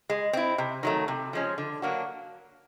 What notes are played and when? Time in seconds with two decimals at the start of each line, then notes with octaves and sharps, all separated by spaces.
0.10 G#3
0.33 C4 E4
0.58 C3
0.83 D#3 F#3 A3
1.08 C3
1.33 F3 G#3 C#4
1.58 D3
1.82 F#3 A#3 D4 F#4